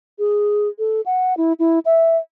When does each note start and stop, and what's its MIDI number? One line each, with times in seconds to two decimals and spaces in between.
0.19 0.68 68
0.79 1.01 69
1.06 1.37 78
1.37 1.53 64
1.59 1.79 64
1.85 2.17 76